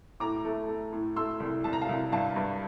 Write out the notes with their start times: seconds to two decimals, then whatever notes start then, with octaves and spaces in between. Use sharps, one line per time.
0.20 A2 A#5 D6
0.45 A3
0.68 A3
0.93 A2
1.16 A3 C6 E6
1.40 C2
1.64 C2 A5
1.73 A#5
1.81 F5 A5
1.89 C2
2.12 G2 F5 A5
2.36 G2